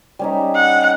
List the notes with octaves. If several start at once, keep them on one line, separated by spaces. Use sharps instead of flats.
G3 C#4 D#4
F#5